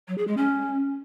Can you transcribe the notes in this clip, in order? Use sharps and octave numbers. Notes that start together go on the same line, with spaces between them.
F#3
G#4
G#3
C#4